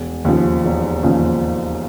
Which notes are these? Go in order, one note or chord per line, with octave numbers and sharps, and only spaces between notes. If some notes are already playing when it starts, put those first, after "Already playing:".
Already playing: E1
D#2 C#3 F3
E1
D#2 C#3 F3